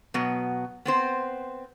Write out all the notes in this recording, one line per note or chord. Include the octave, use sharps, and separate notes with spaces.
B2 F#3 B3
B3 C4 C5